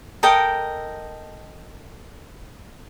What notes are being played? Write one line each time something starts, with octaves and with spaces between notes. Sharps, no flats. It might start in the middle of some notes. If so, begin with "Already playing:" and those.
A4 A#4 D#5 G5